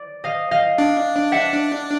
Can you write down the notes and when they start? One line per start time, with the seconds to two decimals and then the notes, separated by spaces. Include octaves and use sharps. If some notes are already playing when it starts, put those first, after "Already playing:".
Already playing: D5
0.24 D#5 F5
0.51 D#5 F5
0.78 D4
1.32 E5 F#5